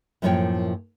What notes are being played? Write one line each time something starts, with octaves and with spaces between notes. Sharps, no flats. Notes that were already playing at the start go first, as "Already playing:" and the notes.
F#2 A2 F3 A#3 C#5 G5